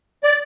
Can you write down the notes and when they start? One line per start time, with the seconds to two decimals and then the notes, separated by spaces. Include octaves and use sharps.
0.23 D5